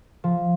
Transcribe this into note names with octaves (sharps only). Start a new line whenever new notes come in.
F3